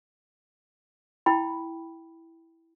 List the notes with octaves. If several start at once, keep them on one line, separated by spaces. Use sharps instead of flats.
E4 G5 B5